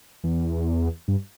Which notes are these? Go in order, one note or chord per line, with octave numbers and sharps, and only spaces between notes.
E2
G2